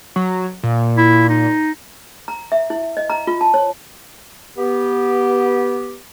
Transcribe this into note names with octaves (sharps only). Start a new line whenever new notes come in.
F#3
A#2
E4
D#4
A#5
E5
E4
D#5
A#5
F4
A5
C#5
B3 G4